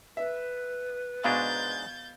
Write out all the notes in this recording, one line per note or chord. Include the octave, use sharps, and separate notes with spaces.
B4 E5
G#2 B2 G#3 D4 F5 C#6 G6 A6